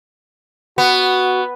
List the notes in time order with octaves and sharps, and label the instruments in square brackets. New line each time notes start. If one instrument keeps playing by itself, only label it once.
[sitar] B3 [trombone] F#4